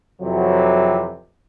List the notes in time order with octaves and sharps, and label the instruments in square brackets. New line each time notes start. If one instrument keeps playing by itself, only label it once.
[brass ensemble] F2 C3 E3 F#3